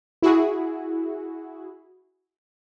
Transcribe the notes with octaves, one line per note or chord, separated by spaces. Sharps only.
E4 F#4 G#4